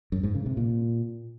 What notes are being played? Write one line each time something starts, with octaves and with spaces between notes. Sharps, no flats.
F#2
G#2
C#3
C3
A#2